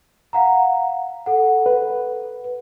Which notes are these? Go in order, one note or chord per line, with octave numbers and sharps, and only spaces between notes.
F5 F#5 A#5
A4 F#5
B4